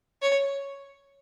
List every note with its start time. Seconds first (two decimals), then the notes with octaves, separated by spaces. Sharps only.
0.22 C#5